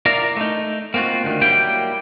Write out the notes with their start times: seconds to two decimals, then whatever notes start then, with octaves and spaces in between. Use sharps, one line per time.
0.06 E4 A#4 D5 F5 A#5
0.37 A3 D#4
0.94 A#3 C4 D#4 F4 F#4
1.24 D2 D#3
1.41 F#3 G3 A#3 E4 G5